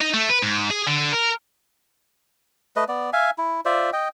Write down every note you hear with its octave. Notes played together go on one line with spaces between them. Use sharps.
D#4
A3
B4
G#2
G#4
D3
A#4
A3 B4 D#5
B3 D5
E5 F5 G#5
E4
F4 C5 D5 E5
D#5 G5